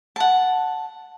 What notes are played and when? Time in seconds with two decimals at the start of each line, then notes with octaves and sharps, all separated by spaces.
0.16 F#5 A5